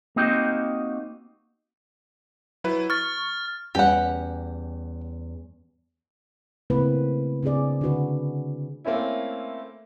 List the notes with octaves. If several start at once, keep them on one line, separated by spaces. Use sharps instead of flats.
A#3 C4 D#4 F#4 G4
F#3 E4 B4
C#6 F6 A6
E2 G3 C#4 G4 F#5
C#3 A3 A#3 C4 E4 B4
C#3 C4 D4 G#4 D5
D3 D4 F#4 B4
A3 A#3 C4 C#4 E4